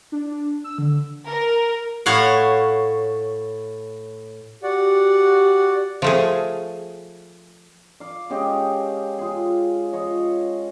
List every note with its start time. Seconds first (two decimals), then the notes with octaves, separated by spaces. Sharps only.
0.12 D4
0.64 E6
0.78 D3
1.28 A#4
2.06 A2 C#5 F5 F#5
4.63 F#4 G4 D5 F#5
6.02 F3 A3 G#4
8.00 F5 D6
8.30 G#3 C#4 G4 D#5
9.18 F4 G#4
9.93 F4 C#5 D#5